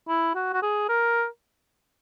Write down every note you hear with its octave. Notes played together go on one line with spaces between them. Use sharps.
E4
F#4
F#4
G#4
A#4